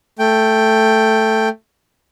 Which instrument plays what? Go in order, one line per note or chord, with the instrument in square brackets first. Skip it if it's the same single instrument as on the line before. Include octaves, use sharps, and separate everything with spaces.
[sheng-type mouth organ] A3 G5